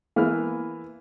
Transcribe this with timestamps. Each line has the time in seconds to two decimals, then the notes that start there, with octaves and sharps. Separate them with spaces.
0.16 E3 A#3 B3 F6